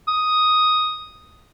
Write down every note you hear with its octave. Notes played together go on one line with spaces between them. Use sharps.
D#6